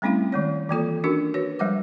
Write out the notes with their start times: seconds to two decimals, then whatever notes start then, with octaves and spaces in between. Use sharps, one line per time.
0.02 G3 A3 C4 C#4 E4 F5
0.32 D#3 G#3 C#5
0.69 E3 A#3 F4 A4
1.04 C#4 D4 F#4 A#4
1.34 F#4 B4 C#5
1.59 F3 G3 G#3 C5 F5 D6